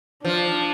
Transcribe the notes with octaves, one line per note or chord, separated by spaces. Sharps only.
F3 D4